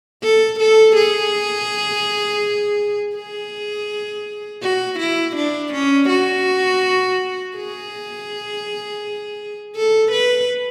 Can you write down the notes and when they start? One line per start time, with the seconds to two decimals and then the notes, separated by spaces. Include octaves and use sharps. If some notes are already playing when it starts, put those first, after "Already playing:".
0.23 A4
0.60 A4
0.96 G#4
3.16 G#4
4.63 F#4
4.99 E4
5.36 D4
5.73 C#4
6.09 F#4
7.56 G#4
9.76 A4
10.12 B4